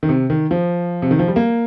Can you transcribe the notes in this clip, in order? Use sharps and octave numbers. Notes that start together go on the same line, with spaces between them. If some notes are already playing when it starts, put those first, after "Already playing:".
D#3
C3
D#3
F3
C3
D#3
F3
G3
A#3